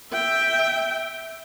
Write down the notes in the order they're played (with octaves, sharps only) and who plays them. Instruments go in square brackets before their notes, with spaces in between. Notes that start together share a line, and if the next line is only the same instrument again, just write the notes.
[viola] E5 G5